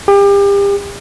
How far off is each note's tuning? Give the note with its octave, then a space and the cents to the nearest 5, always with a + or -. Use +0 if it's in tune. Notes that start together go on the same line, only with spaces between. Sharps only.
G4 +35